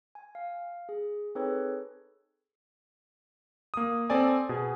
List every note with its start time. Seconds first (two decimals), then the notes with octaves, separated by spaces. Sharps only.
0.15 G#5
0.35 F5
0.89 G#4
1.35 C4 D#4 G#4 A4 B4 C#5
3.74 A#3 D#6
4.10 C4 A4 D5 G#5
4.49 B2 G#4